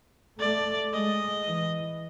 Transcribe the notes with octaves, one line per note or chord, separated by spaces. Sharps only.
A3 D5
G#3 D#5
E3